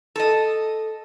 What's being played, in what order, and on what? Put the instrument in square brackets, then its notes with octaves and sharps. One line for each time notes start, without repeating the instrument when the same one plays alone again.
[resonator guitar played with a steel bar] A4 D#5